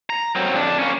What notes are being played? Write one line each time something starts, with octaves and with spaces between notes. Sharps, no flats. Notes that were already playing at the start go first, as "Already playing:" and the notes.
A#5
F#3 C4
F2 D4
A#3 C#4